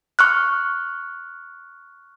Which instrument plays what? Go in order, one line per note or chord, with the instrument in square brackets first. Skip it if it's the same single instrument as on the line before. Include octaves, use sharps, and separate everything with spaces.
[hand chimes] C#6 F6 F#6